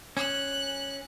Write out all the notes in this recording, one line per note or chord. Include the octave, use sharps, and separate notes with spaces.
C#4 F#6